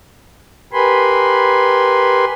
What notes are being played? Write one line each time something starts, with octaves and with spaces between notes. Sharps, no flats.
G4 A#4 B4 G#5 B5 C6